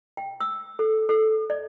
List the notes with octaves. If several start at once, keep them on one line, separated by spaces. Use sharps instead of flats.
G5
E6
A4
A4
D5